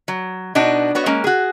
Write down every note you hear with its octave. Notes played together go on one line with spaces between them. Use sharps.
F#3
B2 D4 D#4 F#4
B3 F#4 C#5
G#3 A#3 C#4
F#4 G#4